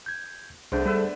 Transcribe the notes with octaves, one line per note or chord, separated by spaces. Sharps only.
G6 G#6
C2 D3 A3 B3 D4 G#4 C5 G6
G3 A4 B4 E5